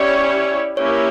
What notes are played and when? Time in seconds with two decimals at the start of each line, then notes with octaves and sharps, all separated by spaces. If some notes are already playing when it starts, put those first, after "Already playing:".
Already playing: C#4 E4 G4 C#5 D5
0.77 A#3 C#4 E4 G4 A#4 C#5